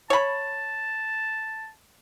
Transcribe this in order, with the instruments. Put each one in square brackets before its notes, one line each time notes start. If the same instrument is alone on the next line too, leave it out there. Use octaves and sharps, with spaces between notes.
[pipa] C#5 B5 [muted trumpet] A5